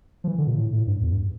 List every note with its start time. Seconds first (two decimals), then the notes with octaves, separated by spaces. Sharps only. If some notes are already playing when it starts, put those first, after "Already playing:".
0.24 F3
0.28 E3
0.38 D3
0.47 A#2
0.57 A2
0.73 A2
0.87 G2
1.02 E2
1.12 G2